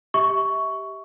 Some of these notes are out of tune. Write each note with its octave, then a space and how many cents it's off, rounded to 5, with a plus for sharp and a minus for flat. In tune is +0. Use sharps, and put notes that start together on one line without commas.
G4 +0 E5 -30 C#6 +10